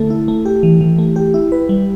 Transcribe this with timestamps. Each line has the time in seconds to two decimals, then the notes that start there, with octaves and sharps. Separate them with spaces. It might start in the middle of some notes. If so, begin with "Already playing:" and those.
Already playing: D3 A3 E4 A4
0.10 E4
0.28 A3
0.45 G4
0.63 E3
0.81 E3
0.98 A3
1.16 G4
1.34 E4
1.52 B4
1.69 G3